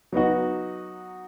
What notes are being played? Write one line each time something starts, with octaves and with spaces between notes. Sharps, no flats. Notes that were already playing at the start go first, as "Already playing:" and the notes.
F#3 B3 D#4 F#4